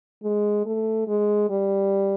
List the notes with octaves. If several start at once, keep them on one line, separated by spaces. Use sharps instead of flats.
G#3
A3
G#3
G3